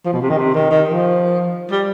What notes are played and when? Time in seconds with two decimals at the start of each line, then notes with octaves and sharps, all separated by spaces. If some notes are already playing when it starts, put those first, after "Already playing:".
0.05 F3
0.13 B2
0.22 C3
0.30 D#3
0.38 C3
0.54 D#3
0.71 D#3
0.89 F3
1.71 G3